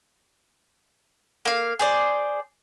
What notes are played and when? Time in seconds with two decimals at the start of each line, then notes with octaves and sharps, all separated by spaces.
1.45 A#3 F5
1.79 G#4 C5 D5